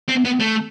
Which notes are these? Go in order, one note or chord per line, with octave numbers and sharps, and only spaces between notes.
C4
B3
A3